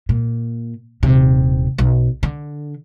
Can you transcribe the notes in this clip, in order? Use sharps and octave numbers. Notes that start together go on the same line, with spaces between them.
A#2
D#1 C3
B1
D3